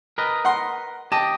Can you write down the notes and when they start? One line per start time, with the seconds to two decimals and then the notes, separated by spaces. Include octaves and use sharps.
0.18 A#4 B4 D#5
0.45 F#5 C6
1.12 G4 D#5 A5